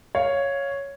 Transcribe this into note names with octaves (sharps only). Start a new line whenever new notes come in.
C#5 F5